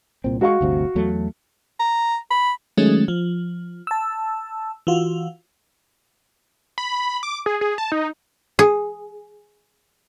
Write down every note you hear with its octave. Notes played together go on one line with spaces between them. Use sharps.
C2 A#2 C4
G#3 F#4 F5 C#6
G1 D2 C3
E2 F#3 A3
A#5
B5
D#3 F#3 G#3 A3 C#4
F3
A5 E6
E3 F4 F#4
B5
D6
G#4
G#4
A5
D#4
G#4